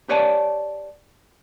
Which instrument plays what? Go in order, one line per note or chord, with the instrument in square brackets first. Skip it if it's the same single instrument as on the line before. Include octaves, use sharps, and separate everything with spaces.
[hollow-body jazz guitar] G4 B4 C#5 D5 G#5 A5